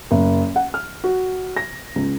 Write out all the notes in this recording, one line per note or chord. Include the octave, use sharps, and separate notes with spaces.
F#1
F#5
F6
F#4
A#6
C#2